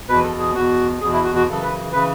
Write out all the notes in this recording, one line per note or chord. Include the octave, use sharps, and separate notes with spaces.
E2 B2 B4
A4
G#4
E2 B2 F#4
E2 B2 G#4
E4
F#4
F#4
F#2 C#3 E3 A4
B4
C#3 E3 B4